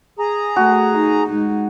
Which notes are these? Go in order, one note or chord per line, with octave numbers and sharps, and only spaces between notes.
G#4 A#5
A3 F#4
D#4
G#3 D#4